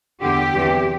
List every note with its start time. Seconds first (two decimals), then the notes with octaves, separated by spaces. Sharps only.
0.22 E2 D3 G4
0.53 E2 C3 E3